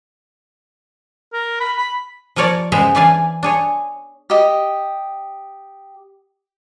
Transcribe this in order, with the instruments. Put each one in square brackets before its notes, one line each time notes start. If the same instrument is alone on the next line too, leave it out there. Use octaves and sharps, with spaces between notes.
[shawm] A#4
B5
B5
[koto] F3 A#3 A#4 C#5 D5
C#3 G#3 B3 C5 E5 A#5
E3 D4 E4 D5 F5 G#5
D4 G#4 C#5
[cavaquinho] G4 D#5